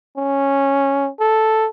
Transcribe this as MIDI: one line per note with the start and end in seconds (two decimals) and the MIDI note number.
0.17 1.09 61
1.20 1.67 69